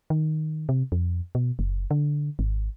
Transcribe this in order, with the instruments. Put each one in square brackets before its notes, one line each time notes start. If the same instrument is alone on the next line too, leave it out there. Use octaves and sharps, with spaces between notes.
[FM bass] D#3
C3
F2
B2
F#1
D3
G#1